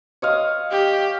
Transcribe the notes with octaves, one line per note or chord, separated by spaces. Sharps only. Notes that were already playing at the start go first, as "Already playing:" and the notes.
C#5 D#5 F5
G4